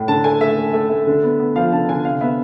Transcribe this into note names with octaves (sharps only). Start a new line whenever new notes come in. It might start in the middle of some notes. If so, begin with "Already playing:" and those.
Already playing: A2
D3 A5
A3 G#5
A3 E5
A3
A3
A3
D3
B3
B3
F3 F5
D3 A5
D3 G#5
C3 F5
B3 E5